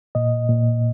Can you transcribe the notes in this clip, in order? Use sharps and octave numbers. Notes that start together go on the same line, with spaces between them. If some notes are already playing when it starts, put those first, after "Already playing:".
A#2 D#5
A#2